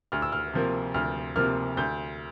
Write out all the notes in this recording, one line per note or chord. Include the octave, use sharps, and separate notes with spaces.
D2 F6
E6
F6
C3 F3 A#3
D2 F6
C3 F3 A#3 F6
D2 G6